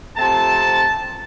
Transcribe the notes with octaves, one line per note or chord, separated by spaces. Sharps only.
C3 F3 A3 C4 A5